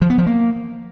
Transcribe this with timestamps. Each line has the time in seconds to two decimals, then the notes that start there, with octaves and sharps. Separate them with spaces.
0.02 F3
0.10 B3
0.18 F3
0.26 A#3